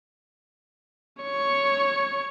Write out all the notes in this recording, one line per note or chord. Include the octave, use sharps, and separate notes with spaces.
C#5 C#6